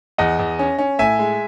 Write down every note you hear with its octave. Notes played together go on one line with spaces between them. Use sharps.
E2 D#5 F#5
E2
C#4
C#4
A2 E5 G#5
G#3